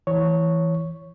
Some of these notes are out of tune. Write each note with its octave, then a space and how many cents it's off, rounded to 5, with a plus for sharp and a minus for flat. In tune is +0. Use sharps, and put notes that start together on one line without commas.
E3 +0 C#5 +0